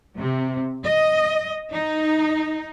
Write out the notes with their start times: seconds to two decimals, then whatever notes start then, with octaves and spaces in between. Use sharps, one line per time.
0.18 C3
0.84 D#5
1.70 D#4